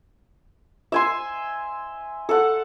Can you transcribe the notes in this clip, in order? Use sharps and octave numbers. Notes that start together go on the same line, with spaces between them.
E5 G#5 C6
A4 F#5